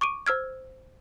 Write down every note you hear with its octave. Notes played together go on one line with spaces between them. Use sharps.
C#6 D6 D7 D#7
C5 E6 F6 G#6